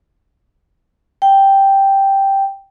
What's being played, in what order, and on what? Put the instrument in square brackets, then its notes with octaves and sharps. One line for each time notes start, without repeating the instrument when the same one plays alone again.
[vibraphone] G5